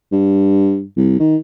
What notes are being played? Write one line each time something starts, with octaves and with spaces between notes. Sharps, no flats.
G2
C2
D#3